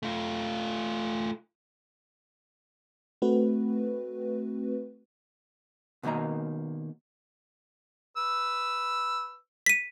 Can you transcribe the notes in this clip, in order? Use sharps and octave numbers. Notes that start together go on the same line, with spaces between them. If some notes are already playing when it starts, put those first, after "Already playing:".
A3 F4
A3 C4 F#4 B4
B2 D#3 A#3 D#5 A#5
B4 E6
B6 D#7